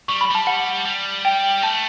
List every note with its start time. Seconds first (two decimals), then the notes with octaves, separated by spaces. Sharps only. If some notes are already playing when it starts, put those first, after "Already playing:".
0.08 G3 C#6
0.21 B5
0.31 G3 A5
0.47 F#5
0.86 G3
1.25 G5
1.62 A3 A5